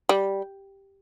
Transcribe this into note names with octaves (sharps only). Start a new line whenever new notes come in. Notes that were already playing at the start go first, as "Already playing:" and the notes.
G3